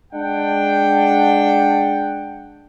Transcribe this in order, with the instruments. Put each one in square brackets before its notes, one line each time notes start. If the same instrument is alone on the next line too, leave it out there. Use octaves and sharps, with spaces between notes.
[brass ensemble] G#3 D4 F#5 G5